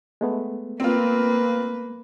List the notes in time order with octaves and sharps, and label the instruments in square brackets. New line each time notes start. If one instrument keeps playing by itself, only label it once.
[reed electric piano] G#3 A3 B3
[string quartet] A#3 B4 [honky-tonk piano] C4 F4